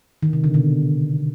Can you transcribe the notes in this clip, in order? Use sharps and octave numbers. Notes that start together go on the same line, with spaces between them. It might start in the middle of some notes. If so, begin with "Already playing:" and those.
D#3
C3
D3
B2